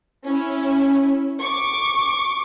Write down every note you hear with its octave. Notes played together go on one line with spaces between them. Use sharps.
C#4 E4
C#6 D6